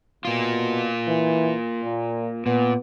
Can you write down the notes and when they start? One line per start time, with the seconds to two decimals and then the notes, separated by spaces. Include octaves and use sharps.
0.25 B2 A#3 F4
1.08 E3
1.83 A#2
2.46 A#2 B3